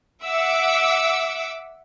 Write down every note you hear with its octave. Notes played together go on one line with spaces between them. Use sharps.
E5 F#5 D6 E6